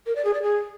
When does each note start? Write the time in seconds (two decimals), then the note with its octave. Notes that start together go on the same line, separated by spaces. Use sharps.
0.06 A#4
0.15 D5
0.24 G#4
0.34 D5
0.43 G#4